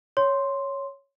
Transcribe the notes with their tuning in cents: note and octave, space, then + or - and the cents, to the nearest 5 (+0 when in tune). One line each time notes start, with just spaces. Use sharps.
C#5 +0 C6 +0